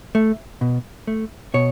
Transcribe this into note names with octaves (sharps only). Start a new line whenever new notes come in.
A3
B2
A3
B2 C#5